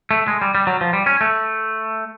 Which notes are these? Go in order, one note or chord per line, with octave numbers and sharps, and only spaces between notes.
A3
G#3
G3
G3
F#3
F3
G3
C#4
A3